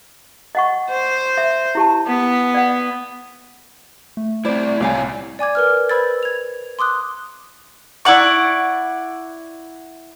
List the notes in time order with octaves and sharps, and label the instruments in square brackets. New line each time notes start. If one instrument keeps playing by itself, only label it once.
[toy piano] D#5 F#5 C#6
[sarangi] C5
[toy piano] E5
E4 G4 A5
[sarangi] B3
[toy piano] D5 F#5
[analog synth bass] A3
[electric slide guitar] C4 E4 [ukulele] C5 D5
[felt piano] C2 D5 [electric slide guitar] A2 G3 C#5 [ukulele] G4 F5 G#5
[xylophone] D5 G#5 D6 G#6
A#4 B4 F6
B4 C5 B5 E6 G#6 A6
G#6 F7
C6 D6 D#6 F#6
[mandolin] E4 D5 F#5 C#6